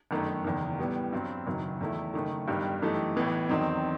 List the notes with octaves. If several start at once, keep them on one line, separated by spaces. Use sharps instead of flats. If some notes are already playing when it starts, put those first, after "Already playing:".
G1 F#2 D#3 A3
F#1 E2 D#3
A2 G3 B3
G2 F#3 C4
F#1 F#2 D#3 F#3
E2 D#3 A3 E4
F#1 F#2 D#3 A3
G1 G2 D#3 G3
F#2 E3 A3 D#4 G4
A1 A2 E3 B3
E2 D#3 F#3 C4 D#4